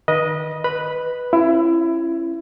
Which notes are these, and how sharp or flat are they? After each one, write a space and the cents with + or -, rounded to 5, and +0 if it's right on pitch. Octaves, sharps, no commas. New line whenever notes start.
D#3 -10 B4 -30 D#5 +0
B4 +0 B5 -5
C#4 -30 E4 +25